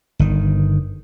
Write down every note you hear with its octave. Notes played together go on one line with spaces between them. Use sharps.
G1 D#3